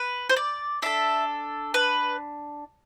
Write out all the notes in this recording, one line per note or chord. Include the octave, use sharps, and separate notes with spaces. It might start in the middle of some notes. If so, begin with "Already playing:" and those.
Already playing: B4
C5
D5
D4 A4 E5
B4